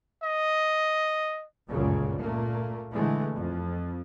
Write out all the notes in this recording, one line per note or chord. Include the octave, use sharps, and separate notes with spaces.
D#5
G1 C#2 F#2 A#2 C#3
A#2 A3 A#3
D3 E3 G#3 A3
F2